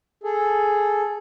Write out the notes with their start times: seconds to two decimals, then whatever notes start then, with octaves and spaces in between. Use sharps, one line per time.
0.24 G#4 A4